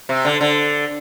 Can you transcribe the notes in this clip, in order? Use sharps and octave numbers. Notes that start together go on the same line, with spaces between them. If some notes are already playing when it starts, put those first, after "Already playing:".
C3
D3
D3